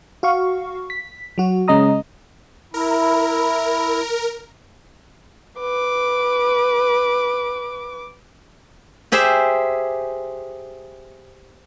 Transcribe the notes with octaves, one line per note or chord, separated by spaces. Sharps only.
F#4 F5 C#6
B6
F#3 F#4
C#3 G#3 C#4 D#5 A#5 D#6
E4 A#4
B4 D6
G4 G#4 C5 E5